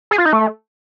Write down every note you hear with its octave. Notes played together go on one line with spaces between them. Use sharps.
G#4
F4
D#4
A3